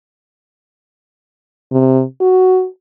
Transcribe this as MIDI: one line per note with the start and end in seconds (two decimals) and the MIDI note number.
1.72 2.03 48
2.21 2.66 66